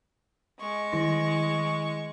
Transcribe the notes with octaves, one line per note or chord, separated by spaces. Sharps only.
G#3 C#6
D#3 E4 A#6